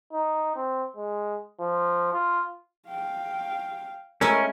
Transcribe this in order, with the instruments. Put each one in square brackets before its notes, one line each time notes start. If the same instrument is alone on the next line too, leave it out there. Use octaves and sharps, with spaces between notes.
[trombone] D#4
C4
G#3
F3
F4
[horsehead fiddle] F5 G5
[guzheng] G#3 A3 E4 [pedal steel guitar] C#4 [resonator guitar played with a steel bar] A#4